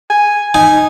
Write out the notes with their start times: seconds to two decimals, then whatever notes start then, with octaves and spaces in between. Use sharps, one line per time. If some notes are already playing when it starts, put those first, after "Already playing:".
0.10 G#5
0.54 D#4 G#5